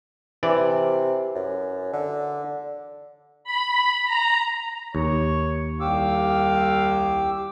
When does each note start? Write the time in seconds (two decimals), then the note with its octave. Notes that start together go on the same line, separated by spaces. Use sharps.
0.43 C3 E3 D5
1.35 F#2
1.93 D3
3.44 B5
4.05 A#5
4.95 D#2 C#5
5.80 C2 G4 F5 D6 E6